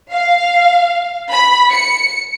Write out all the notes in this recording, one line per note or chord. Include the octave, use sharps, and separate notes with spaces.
F5
B5
C#7